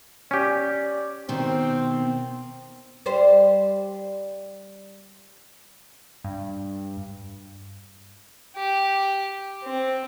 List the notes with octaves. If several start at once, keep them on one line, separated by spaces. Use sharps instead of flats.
C#4 G4 D5
B2 D#3 C4
G3 C5
G2
G4
C4